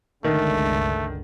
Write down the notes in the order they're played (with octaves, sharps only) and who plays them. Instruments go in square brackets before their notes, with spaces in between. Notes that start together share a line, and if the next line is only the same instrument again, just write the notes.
[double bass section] G1 C#2 D3 [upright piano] D#3 [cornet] A3